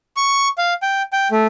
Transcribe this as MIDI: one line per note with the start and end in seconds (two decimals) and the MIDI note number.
0.17 0.48 85
0.58 0.74 77
0.82 1.02 79
1.13 1.28 79
1.31 1.47 57